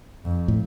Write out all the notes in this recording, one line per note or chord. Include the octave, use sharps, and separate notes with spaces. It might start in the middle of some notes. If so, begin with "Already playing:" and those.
F2
A2